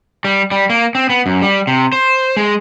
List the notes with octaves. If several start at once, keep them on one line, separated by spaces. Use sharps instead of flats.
G3
G3
A#3
C4
B3
F#2
G3
C3
C5
G#3